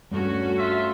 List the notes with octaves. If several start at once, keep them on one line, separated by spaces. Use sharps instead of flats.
G2 A3 C#4 F#4
F4 E5